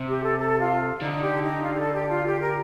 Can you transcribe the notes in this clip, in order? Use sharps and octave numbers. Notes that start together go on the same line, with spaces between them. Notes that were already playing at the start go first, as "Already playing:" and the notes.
Already playing: C3
G4
A4
A4
F4
D3 D#4
G4
D#4
F4
G4
A4
G4
F4
G4
A#4